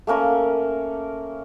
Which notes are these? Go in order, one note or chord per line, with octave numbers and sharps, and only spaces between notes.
A3 A#3 C#4 A#4